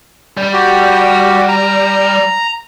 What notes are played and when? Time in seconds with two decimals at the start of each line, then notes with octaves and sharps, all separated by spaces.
0.37 G3
0.53 F#4 G4
1.48 A#5